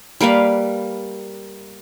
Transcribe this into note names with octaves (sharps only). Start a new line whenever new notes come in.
G3 A#3 B4 F5